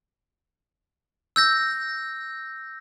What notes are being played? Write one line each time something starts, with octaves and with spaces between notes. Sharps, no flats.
E6 G6 A#6